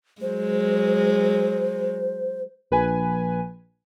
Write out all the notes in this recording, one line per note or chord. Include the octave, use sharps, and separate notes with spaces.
F#3 G#3 C5
A#1 B4 G#5